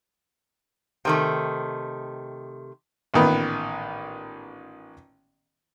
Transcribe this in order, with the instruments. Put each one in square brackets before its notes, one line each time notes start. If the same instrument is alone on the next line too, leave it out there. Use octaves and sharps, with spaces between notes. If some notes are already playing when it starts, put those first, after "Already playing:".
[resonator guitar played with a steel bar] C3 D#3 A3
[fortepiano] A1 A#2 D#3 B3 B4